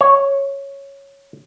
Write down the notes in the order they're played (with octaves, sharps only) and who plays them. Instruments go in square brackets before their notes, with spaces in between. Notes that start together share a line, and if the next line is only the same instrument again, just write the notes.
[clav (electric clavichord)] C#5